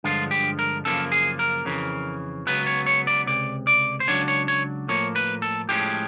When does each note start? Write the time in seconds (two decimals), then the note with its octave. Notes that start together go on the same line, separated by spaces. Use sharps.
0.04 G2 D3 F3 G#3 F4
0.31 G4
0.59 A#4
0.85 F#2 C#3 F3 A#3 A4
1.12 G#4
1.39 A#4
1.65 F2 C#3 E3
2.47 C#2 C#3 F#3 B3 B4
2.66 C#5
2.86 C#5
3.07 D5
3.27 C#2 C3 D5
3.67 D5
4.00 C5
4.08 C#2 C#3 F#3 D4 C#5
4.28 C#5
4.48 C#5
4.88 A2 F3 A#3 C#5
5.16 B4
5.42 A4
5.69 A2 F3 G#3 C#4 G4